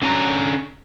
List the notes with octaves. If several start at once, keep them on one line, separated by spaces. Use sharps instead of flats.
D3 C#4 A5 A#5